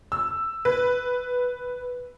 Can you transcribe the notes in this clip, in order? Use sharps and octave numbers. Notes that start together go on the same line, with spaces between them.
E6
B4